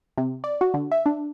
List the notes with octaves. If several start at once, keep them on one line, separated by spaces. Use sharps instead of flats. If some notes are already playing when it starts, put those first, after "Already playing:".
C3
D5
F#4
D3
E5
D4